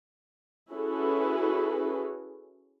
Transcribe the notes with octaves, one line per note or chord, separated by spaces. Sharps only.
C#4 E4 F#4 G#4 A4 B4